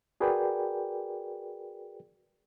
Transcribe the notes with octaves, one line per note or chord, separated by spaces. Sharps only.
F#4 G#4 A#4 B4 D5 G5